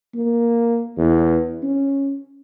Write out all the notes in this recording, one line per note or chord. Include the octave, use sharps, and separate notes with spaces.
A#3
E2
C#4